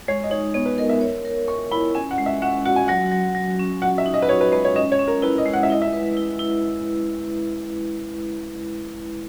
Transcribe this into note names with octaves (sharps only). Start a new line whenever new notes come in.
G#3 C#5
D#5
D#4 C#5
B3 C#5
B4
A#4 D#5
E5
C#5
A#4
A#4 C#6
E4 B5
C#4 G#5
F#5
G#3
E5
C#4 F#5
F#4 F#5
G#5
F#3 F#5
F#3
F#3
C#4
F#4 F#5
E5
D#4
D#5
B4
F#4 C#5
B4
G#3 B4
C#5
C#4 D#5
C#5
C#4
A#4
E4 B4
D#5
G#3
F#5
E5
E4 D#5
E5
B4
E4
E4